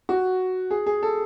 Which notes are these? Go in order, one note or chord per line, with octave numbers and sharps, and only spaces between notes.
F#4
G#4
G#4
A4